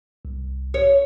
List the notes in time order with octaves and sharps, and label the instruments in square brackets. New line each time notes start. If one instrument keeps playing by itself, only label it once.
[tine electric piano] C2
[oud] C#5